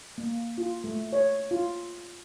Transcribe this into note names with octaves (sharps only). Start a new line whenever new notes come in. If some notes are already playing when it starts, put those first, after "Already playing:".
A#3
F4
A3
C#5
F4